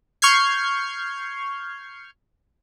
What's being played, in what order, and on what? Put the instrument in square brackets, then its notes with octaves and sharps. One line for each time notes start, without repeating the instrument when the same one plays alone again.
[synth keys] C#6 F6 G6 G#6 C7